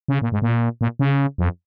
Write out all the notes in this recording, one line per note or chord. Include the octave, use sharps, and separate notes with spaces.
C#3
A#2
G#2
A#2
A#2
C#3
F2